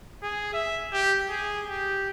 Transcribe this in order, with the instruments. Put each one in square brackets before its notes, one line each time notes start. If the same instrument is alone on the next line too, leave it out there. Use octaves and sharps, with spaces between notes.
[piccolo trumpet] G#4
E5
G4
G#4
G4